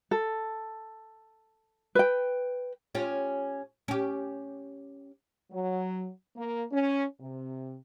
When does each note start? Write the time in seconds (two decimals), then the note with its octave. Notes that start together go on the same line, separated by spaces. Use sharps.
0.11 A4
1.95 B4 G5
2.95 C#4 F4 G4
3.88 C#4 G4
5.51 F#3
6.36 A#3
6.72 C#4
7.20 C3